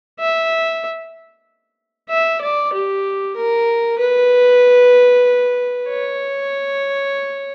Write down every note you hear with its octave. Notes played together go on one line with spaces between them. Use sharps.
E5
E5
D5
G4
A#4
B4
C#5